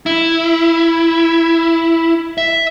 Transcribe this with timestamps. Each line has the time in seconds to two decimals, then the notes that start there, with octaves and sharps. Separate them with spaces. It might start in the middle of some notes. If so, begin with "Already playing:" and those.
0.06 E4
2.38 E5